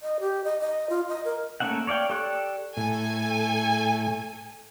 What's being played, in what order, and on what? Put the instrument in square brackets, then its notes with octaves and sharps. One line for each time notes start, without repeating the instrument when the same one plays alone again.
[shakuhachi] D#5
G4
D#5
D#5
F4
D#5
A#4
[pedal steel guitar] A3 A#3 C#4 E5 F#5
C#5 D5 F5 G5
G4 A4 D5 C#6 F#6
[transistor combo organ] A2 [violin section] A4 G#5